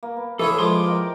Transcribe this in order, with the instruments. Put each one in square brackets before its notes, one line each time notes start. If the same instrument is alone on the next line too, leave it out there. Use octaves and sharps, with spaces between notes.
[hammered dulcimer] A#3
B3
[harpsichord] E3 C#4 G#4 [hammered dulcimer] A3 E4 [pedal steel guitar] A4
[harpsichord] F3 G#3 [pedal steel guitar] C6 D6
[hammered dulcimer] A#4 D#5 G5